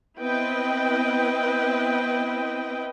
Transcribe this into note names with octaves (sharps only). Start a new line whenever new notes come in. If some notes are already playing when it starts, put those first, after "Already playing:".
B3 C4 E4 B4 D#5 G5